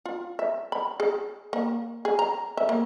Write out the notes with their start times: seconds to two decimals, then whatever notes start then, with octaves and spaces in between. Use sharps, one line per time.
0.06 F4
0.39 E5
0.72 B5
1.00 G#4
1.53 A#3
2.05 G#4
2.19 A#5
2.57 E5
2.69 A#3